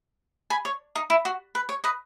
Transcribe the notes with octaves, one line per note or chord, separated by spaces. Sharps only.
G#5 B5
C#5
D#4
E4
F#4
B4
C#5
B4 D#5